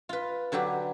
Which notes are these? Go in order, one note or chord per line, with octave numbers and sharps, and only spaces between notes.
F4 B4
D3 F#3 F#4 G4 B4